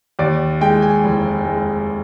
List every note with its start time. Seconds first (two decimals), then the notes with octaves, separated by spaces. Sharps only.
0.19 D#2 D5
0.61 G#3 G5
0.82 G#5
1.04 F1
1.45 G#3